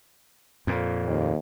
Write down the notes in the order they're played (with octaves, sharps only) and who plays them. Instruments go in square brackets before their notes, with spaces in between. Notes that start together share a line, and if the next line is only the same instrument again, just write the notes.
[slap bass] F2 A#2
[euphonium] D#2